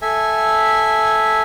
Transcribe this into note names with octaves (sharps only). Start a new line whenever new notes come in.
A4 E5 G#5